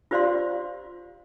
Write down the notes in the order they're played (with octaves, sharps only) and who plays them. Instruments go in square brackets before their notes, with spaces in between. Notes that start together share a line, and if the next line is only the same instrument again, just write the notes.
[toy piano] F4 G4 C5 D5 F5 C6